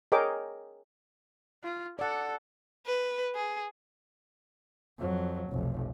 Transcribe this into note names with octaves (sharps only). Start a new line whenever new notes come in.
G#4 A#4 C#5 D#5 G5 D6
F4
A4 D5 F#5
B4
G#4
F2 F#3
F1 B1